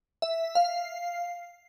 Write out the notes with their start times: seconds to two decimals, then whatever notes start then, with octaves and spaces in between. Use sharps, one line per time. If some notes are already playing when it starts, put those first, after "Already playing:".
0.22 E5
0.55 F5